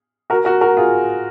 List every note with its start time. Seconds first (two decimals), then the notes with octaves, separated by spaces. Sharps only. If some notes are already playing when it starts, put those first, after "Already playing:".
0.30 F#4 A#4
0.45 F#4 A#4
0.61 F#4 A#4
0.77 F4 G#4